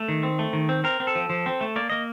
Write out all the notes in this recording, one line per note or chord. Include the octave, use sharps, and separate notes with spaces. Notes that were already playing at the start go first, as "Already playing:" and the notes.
Already playing: A3
D#3
C4
A3
D#3
C4
C4 A#4
C4
A4
F3
F3
C4
A3
A#3 D5
A#3 D#5